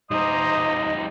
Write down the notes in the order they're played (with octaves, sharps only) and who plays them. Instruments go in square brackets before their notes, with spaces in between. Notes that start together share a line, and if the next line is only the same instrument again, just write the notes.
[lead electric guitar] G3 D#4 [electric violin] C5 A#5 [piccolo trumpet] D#5 [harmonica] D#6